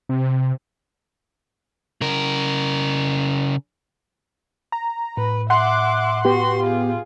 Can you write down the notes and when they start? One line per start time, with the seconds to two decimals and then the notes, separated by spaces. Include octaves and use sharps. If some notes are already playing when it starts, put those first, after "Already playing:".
0.09 C3
2.01 C#3 A#4
4.72 A#5
5.17 A2 B4
5.50 E5 F#5 C6 D6 F#6
6.25 B3 F#4 G4 C6
6.63 F4 G#4